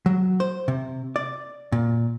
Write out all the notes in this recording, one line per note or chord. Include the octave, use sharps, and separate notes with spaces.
F#3
C5
C3
D5
A#2